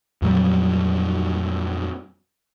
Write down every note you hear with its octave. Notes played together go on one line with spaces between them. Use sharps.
F2 A#2 F#3 G3